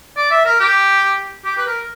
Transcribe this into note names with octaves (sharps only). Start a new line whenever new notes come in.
D5
E5
A#4
G4
G4
B4
A#4